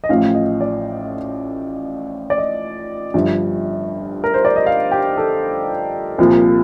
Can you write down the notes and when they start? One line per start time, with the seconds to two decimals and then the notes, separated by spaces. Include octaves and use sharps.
0.04 D#5
0.09 A1 A2 F3 F5
0.35 D#5
0.61 D5
2.30 D5
2.38 D#5
3.14 G1 G2 F3
4.24 A#4
4.34 C5
4.45 D5
4.56 D#5
4.66 F5
4.91 G4
5.17 A4
6.18 C2 A#2 F3